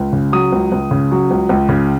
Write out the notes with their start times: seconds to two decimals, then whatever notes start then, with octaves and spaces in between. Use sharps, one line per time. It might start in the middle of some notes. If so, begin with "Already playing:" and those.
Already playing: C#2
0.13 C#3
0.32 F#3 D#6
0.52 C#2
0.72 C#2
0.91 C#3
1.11 F#3
1.31 C#2
1.49 C#2
1.69 C#3